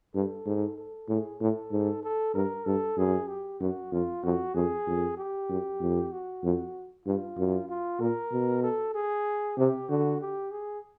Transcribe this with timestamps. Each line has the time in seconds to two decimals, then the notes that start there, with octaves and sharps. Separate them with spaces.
0.14 G2 A4
0.46 G#2
0.78 A4
1.09 A2 G#4
1.41 A2 A4
1.72 G#2
2.03 A4
2.35 G2 A#4
2.66 G2 A4
2.97 F#2 G#4
3.29 G4
3.60 F#2 F#4
3.92 F2 F4
4.23 F2 F#4
4.55 F2 G#4
4.87 F2
5.18 G4
5.49 F#2
5.81 F2
6.12 F#4
6.44 F2
7.06 G2 F4
7.38 F#2
7.69 F4
8.00 A#2 A#4
8.32 B2
8.63 A4
8.94 G#4
9.58 C3 G4
9.89 D3 F#4
10.21 G4
10.52 G#4